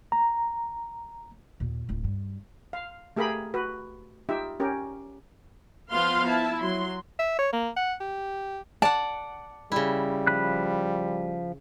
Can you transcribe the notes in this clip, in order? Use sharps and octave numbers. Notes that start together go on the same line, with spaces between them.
A#5
D#2 A#2
D1 F4
G2
F5
A3 G4 G#4 A#4 F5 B5
F#4 B4
D#4 F4 G4 E5
C#4 G4 A#4
F3 B3 F4 F5 C6
E4 A5
F#3 C6
E5
C#5
A#3
F#5
G4
D5 F#5 A5
C#3 G3 E4
F3 B5 F#6